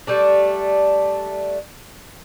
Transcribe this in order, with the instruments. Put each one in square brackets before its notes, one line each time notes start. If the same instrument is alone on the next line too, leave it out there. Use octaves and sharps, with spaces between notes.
[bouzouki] G3 A3 D4